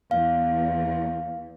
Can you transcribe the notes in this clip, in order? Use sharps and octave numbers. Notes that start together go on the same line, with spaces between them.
E2 F5